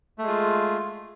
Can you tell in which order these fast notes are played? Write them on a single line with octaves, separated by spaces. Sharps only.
A3 G#3 F4